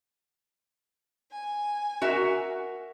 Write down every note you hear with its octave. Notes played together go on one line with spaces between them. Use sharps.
G#5
F#4 A#4 E5